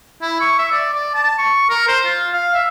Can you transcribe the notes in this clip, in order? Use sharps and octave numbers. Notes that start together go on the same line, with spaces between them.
E4
C#6
E5
D5
D5
A5
C#6
A#4
C5
F4
F5
E5